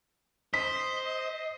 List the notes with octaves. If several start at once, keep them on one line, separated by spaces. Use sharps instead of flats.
C5 D#5 B6